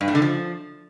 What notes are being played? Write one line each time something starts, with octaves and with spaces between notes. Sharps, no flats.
G2
A2
D3
F3